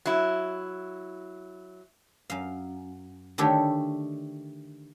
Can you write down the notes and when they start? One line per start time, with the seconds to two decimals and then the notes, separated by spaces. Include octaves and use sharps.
0.05 F#3 E4
2.30 F#2 F5
3.38 D3 D#3 A3 G4 A4 C#5